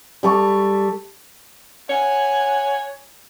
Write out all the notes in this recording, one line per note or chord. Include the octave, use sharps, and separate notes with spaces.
G3 A4 C#6
C#5 F#5 G#5